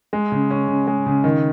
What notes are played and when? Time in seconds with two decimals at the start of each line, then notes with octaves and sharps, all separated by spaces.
0.13 G#3
0.32 C#3
0.51 C#4
0.68 C#3
0.87 G#3
1.06 C#3
1.24 D#3